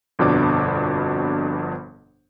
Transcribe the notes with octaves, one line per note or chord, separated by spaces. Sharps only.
G1 F2 B2 D4 D6